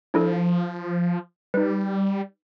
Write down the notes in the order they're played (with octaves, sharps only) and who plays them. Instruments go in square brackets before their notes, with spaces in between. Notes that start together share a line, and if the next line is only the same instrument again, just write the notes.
[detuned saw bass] F3 [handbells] D4 E4 A4
[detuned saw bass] G3 [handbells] D#4 B4